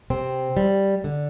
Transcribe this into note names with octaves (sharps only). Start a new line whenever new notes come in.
C3 C4
G3
D3